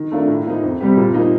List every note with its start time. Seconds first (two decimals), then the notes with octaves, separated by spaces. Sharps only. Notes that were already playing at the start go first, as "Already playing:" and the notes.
Already playing: D#3
0.11 A3 D4 F4 A#4
0.28 A2
0.46 F3 A#3 D#4
0.63 F2
0.81 C3 G3 C4 G4
0.97 A#2
1.14 F3 A#3 D#4